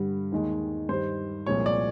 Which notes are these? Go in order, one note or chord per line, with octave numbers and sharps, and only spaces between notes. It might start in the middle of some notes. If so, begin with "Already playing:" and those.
Already playing: G2 D3 G3
D#2 D#3 G#3
G2 D#3 G3 C5
C2 A#2 F3 G#3 C#5
D5